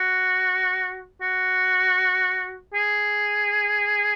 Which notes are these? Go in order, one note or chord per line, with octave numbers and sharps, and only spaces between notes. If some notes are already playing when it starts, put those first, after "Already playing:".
Already playing: F#4
F#4
G#4